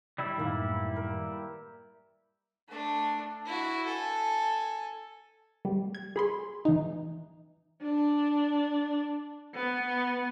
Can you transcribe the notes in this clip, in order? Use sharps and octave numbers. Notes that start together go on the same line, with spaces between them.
G3 E4
F#2 A2 D#3 E3 A#3
A#4
A3 D4
E4 F#4
A4 G#5
G3
G#6
G#4 B5 C6
E3 D#4
D4
B3